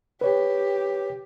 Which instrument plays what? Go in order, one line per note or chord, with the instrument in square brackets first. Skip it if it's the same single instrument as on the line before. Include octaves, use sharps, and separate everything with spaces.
[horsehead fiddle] G4 [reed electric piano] B4 C#5